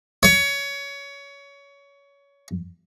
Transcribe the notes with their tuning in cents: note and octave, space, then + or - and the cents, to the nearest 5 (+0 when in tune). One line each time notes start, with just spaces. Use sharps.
C#5 +20